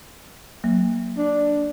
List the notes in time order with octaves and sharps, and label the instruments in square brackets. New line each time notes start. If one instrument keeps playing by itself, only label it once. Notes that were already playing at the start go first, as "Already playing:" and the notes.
[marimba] F#3 A#3
[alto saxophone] D4